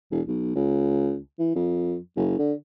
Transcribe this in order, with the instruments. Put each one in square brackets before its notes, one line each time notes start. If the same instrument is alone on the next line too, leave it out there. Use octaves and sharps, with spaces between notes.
[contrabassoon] E1
B1
C#2
E3
F2
F#1
D3